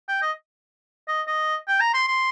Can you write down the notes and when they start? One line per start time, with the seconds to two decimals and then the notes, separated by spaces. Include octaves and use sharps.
0.08 G5
0.22 D#5
1.08 D#5
1.27 D#5
1.68 G5
1.80 A#5
1.94 C6
2.07 C6